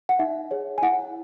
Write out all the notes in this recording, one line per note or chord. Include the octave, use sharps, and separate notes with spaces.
F#5
D#4 E5
G#4 C#5
G#5
E4 F#5